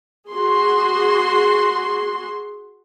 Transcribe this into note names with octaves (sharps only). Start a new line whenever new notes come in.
F#4 G#4 C6